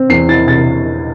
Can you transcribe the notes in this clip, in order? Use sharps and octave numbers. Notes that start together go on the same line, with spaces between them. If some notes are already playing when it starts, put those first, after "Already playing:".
Already playing: C4
E2 C7
E4 A6
C3 A6